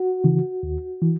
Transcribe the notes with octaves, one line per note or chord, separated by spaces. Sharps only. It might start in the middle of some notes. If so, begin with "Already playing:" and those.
Already playing: F#4
C#3 E3
D#2
E3